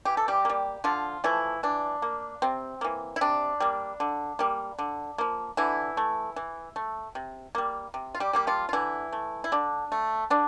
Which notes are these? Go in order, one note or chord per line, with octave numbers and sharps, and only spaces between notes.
E3 G4
A4
G3 G4
G3 A#3
D3 F3 F4
E3 F3 A3 E4
E3 D4
A#3
C3 C4
E3 A#3
E4
C3 D4
G3 A#3
D3
G3 A#3
D3
F3 A#3
D3 E3 E4
A3
E3
A3
C3
G3 A#3
C3
F4
G3 G4
G3 A#3 G4
F3 F4
F4
D3 E3 E4
A3
E4
D3 D4
A3
D3 D4